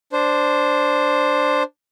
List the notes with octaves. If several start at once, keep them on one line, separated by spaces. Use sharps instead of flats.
D4 C5